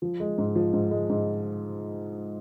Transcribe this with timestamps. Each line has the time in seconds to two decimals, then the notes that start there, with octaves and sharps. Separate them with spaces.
0.02 F3
0.20 G#3
0.38 G#2
0.56 F3
0.73 G#2
0.91 G#3
1.09 G#2